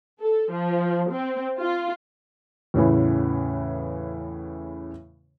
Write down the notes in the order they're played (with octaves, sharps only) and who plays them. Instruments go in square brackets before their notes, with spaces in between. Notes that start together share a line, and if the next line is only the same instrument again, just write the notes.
[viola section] A4
F3
C4
F4
[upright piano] E2 A2 C#3 E3